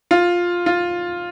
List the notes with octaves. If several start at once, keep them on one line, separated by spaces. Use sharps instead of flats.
F4
F4